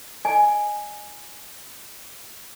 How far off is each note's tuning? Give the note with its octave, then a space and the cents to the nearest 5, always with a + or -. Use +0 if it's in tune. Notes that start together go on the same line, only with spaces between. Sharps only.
D#5 -35 G#5 +0